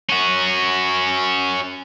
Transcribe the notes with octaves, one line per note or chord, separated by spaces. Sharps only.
C#4 F#4